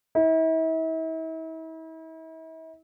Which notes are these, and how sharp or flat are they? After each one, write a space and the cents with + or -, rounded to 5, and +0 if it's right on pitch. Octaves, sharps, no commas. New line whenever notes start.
E4 -40